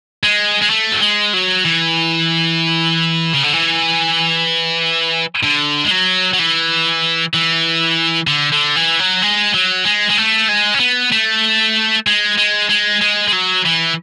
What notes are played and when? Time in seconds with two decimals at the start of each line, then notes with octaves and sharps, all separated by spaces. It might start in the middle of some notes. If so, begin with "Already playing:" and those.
0.23 G#3
0.62 G#3
0.70 A3
0.92 F#3
1.02 G#3
1.34 F#3
1.65 E3
3.34 C#3
3.44 D3
3.54 E3
5.43 D3
5.84 G#3
5.91 F#3
6.34 F#3
6.39 E3
7.34 E3
8.27 D3
8.52 D3
8.76 E3
8.99 F#3
9.22 G#3
9.55 F#3
9.85 G#3
10.10 G#3
10.18 A3
10.49 G#3
10.74 C#4
10.80 B3
11.12 A3
12.07 G#3
12.38 G#3
12.69 G#3
13.01 G#3
13.28 G#3
13.32 F#3
13.65 E3